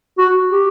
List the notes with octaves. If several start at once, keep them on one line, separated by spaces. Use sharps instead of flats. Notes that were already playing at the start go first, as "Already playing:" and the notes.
F#4
G4